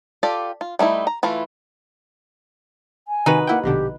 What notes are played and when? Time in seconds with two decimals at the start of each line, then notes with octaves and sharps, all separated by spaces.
0.23 F4 G4 A4 D5
0.61 F4
0.79 G3 A3 D#4 E4
1.07 A#5
1.23 E3 A3 E4 F4
3.08 G#5
3.26 C3 D#3 D#4 F#4 B4
3.47 A#3 E4 F#5 G5
3.64 A#1 B2 D3 G4